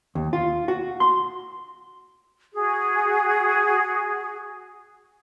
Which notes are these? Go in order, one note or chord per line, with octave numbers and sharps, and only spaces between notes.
D#2
F4
F#4
C6
F#4 G#4